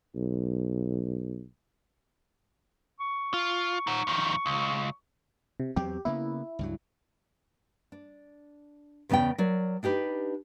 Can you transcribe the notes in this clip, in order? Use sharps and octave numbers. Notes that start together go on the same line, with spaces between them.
B1
C#6
F4
D#4 F#5
F2 D#3
C#2
C3
E2 F#3 C4 G4
C#3 A#3 B3 E4
C#2 G2 F#3
D4
E2 C#3 B3 D5 G5
F#3 A#4 D5
D4 D#4 G4 B4